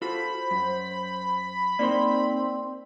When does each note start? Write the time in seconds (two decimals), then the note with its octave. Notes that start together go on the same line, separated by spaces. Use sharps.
0.02 F4 F#4 A4 C5 B5
0.51 F#2
1.79 A#3 C4 D#4 C5 D5 C6